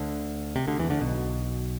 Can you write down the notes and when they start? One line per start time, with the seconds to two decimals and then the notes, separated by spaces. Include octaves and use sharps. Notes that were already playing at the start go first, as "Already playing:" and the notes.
Already playing: D2 D3
0.56 C3
0.67 D2 D3
0.79 E2 E3
0.90 D2 D3
1.01 B1 B2